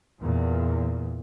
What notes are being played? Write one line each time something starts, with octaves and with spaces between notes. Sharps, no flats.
E2 A#2